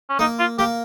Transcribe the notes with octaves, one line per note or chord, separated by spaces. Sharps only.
C#4
A#3 D#4
F4
A#3 G4